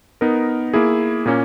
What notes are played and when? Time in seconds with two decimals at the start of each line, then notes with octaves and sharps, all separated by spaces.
0.21 B3 D#4 A#4
0.74 A#3 E4 G#4
1.26 A#2 A#3 C#4